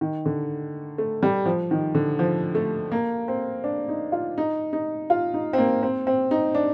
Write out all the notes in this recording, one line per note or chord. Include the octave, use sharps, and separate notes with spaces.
D#3
D3
A3
G3
F3
D#3
D3
F3
A3
A#3
C4
D4
D#4
F4
D#4
D#4
F4
D#4
C4
A#3
C4
C4
D#4
D4